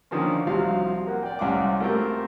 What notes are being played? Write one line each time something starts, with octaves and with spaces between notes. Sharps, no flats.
D3 D#3 F3 A#3 C#4
C2 C3 F3 F#3 F5
A#3 F#5
D5 G5
C2 C3 C#4 F5 F#5 D6
A3 A#3 C4 F4 G4 A#4